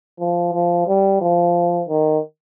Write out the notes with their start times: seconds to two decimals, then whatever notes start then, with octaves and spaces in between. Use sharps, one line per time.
0.19 F3
0.53 F3
0.87 G3
1.21 F3
1.88 D#3